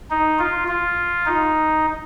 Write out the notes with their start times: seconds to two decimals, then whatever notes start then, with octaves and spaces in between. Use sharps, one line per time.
0.10 D#4
0.39 F4
0.68 F4
1.26 D#4